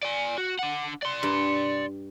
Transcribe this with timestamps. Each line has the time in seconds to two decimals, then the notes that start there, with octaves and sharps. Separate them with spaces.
0.03 D5 G#5
0.38 F#4
0.59 D4 F#5
1.03 D5 C6
1.23 G2